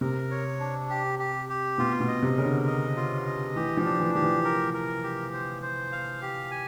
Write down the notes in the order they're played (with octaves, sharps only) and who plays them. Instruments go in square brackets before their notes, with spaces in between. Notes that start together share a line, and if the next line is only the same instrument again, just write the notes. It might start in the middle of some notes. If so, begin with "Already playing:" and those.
[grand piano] C3 [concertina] A#4
[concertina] C#5
D4
G4
G4
G4
[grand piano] B2 [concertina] F4
[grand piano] B2
[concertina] D#5
[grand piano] C3
[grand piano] C#3 [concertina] A#4
[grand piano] D3
[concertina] D#5
F4
D#5
[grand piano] E3 [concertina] G4
[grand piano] F3
[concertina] D4
[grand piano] E3
[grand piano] F3 [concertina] G4
[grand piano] E3
[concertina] A#4
A#4
G4
C5
C5
F5
G4
G#5